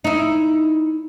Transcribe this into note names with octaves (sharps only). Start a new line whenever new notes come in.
D#4 E4